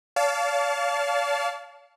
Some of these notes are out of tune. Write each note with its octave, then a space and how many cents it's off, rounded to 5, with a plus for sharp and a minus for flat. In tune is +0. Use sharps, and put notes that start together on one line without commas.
D5 -45 F5 +0 A5 -10